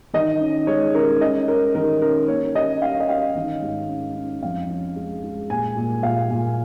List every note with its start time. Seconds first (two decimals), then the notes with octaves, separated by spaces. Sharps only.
0.14 D#3 D#5
0.41 C#4
0.67 G#3 C#5
0.95 C#4 A#4
1.21 C#4 D#5
1.48 C#4 A#4
1.75 D#3 A#4
2.01 C#4 A#4
2.28 A#3 C#5
2.55 C#4 D#5
2.82 C#4 F5
3.00 D#5
3.09 C#4 F5
3.35 D#3
3.62 G#2
3.89 C#4
4.16 C#4
4.42 F2 F5
4.70 C#4
4.96 G#3
5.23 G#3
5.50 A#2 G#5
5.76 A#2
6.03 A#2 F5
6.30 A#2